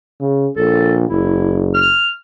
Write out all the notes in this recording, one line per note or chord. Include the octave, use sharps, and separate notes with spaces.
C#3
A#1 A4
F#1 E4
F6